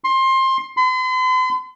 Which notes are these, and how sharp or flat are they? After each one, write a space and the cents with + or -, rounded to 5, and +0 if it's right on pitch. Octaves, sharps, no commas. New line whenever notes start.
C6 +20
C6 -45